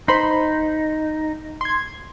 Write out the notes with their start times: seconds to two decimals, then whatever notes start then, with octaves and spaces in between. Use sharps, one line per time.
0.08 D#4 C5 B5 C6
1.61 C6 G#6